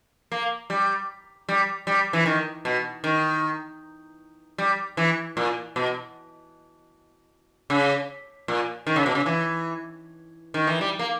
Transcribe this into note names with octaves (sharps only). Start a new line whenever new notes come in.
A#3
G3
G3
G3
E3
D#3
B2
D#3
G3
E3
A#2
B2
C#3
A#2
D#3
C#3
B2
C#3
E3
D#3
E3
G3
A#3